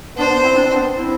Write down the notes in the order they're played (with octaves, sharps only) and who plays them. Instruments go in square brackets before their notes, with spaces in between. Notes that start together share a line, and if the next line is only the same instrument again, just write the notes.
[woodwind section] B3 D4 [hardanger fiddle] C5
[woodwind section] B3 D4
C4 E4
D4
C4
B3 D4
C4 E4